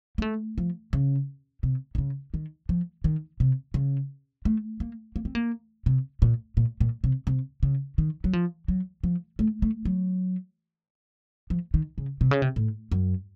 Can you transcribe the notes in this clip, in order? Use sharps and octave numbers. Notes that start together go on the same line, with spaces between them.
A#3
A3
F3
C#3
C3
D#3
C#3
D#3
F3
D#3
C3
C#3
A3
A#3
A#3
C4
A#3
C3
A#2
A#2
A#2
C3
C3
C#3
D#3
F#3
F3
F#3
F3
A3
A3
F#3
F3
D#3
C#3
C3
C#3
C3
A2
F#2